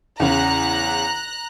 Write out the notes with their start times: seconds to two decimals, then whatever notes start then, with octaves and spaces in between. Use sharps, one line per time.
0.20 E2 C#3 A#5 F#6